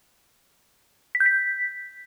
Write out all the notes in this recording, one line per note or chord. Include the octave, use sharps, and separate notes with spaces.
B6
G6
B6